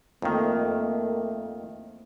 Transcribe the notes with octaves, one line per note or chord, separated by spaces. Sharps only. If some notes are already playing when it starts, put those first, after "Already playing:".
F2 D#3 A3 A#3